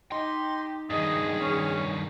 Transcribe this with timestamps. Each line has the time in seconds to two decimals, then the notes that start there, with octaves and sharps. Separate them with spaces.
0.12 D#4 G4 C6
0.90 G2 D#3 G#4 D#5
1.40 C#4